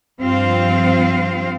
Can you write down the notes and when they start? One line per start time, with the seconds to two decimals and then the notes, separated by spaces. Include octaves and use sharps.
0.21 G2 F3 C4 F4 F5